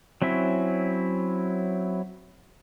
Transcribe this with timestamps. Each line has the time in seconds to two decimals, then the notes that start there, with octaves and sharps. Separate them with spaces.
0.22 F#3 C4 C#4 E4